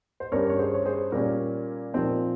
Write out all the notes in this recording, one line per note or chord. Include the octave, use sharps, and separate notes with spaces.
C5
G2 G3 C#4 A#4 C#5
C#5
G#4 C5
C#5
G#4 C5
A#2 G3 C#4 A#4
A#2 F3 C4 D#4